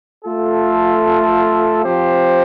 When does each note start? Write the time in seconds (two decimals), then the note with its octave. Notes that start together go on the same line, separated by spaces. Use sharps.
0.25 A3 F4 A4
1.83 F3 C4 G4 C5